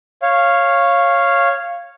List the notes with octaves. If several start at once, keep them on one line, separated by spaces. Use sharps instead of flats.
C#5 F5